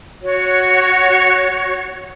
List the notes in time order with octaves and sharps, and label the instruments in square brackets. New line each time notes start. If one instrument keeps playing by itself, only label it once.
[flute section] F#4 C#5